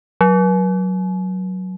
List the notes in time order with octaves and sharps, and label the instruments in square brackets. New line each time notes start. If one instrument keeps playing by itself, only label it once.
[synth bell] F#3